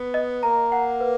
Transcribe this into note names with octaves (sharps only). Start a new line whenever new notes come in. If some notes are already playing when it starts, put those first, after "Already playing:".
Already playing: B3
D#5
A#3 A#5
F#5
B4